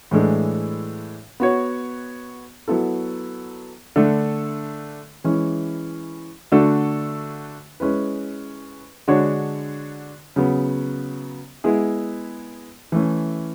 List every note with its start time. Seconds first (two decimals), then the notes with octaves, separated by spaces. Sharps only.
0.11 A2 E3 G#3 D4 A4
1.40 B3 F#4 C#5
2.68 F#3 B3 E4 A4
3.96 D3 A3 D4 A4
5.24 E3 G#3 C#4 E4
6.52 D3 A3 D4 F#4 A4
7.80 G#3 C#4 E4 B4
9.08 D3 G#3 D4 F#4 C#5
10.36 C#3 F#3 B3
11.64 G#3 B3 E4 G#4
12.92 E3 A3 C#4